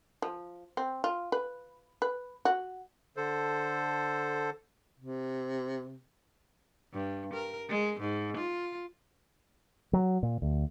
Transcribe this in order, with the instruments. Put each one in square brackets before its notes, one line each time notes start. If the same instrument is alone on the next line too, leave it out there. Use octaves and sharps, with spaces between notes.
[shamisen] F3
C4
F4
B4
B4
F#4
[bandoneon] D3 A4 C5
[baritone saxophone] C3
[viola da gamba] G2
A#4
G#3
G#2
F4
[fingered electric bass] F#3
A#2
D2